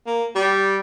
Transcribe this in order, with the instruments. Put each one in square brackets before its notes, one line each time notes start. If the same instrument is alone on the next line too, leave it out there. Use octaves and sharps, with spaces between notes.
[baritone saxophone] A#3
G3